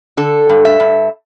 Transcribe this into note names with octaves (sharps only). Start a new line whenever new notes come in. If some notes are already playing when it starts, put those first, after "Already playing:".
D3 A4
G2
E5
G2